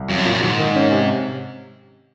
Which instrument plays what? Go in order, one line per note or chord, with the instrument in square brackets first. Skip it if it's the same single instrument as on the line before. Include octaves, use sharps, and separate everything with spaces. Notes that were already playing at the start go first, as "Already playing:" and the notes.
Already playing: [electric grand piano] C2
[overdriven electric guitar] F2 [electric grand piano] F#3
[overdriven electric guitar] F#2
[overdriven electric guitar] F2 [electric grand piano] A#2
[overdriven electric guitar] F#2
[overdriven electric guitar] G#2 [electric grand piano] D#3
[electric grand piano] D#3
C#4
C3